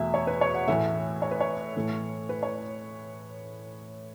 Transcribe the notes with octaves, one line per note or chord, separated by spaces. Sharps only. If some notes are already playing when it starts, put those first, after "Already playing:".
Already playing: E2 B2 A3 E5
C#5
B4
C#5
F#5
A2 E3 A3 E5
C#5
B4
C#5
A2 E3 A3
B4
C#5